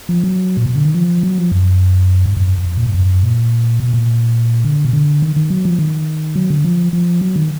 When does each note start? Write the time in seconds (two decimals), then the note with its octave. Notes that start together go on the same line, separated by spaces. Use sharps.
0.09 F3
0.24 F#3
0.57 A#2
0.66 B2
0.76 D3
0.85 D#3
0.94 F3
1.23 F#3
1.38 F3
1.52 F#2
2.26 G#2
2.37 F#2
2.58 F#2
2.66 F2
2.77 A#2
2.86 G#2
2.94 F#2
3.23 A#2
3.80 B2
3.94 A#2
4.64 D3
4.85 B2
4.93 D3
5.22 D#3
5.36 D#3
5.50 F#3
5.65 F3
5.79 D#3
6.36 F#3
6.50 D3
6.65 F3
6.93 F3
7.21 F#3
7.36 D#3